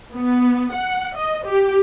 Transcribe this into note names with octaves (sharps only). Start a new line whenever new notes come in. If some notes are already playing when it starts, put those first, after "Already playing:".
B3
F#5
D#5
G4